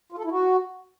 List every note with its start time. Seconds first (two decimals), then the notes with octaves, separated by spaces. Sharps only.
0.12 F4
0.19 A4
0.25 E4
0.31 F#4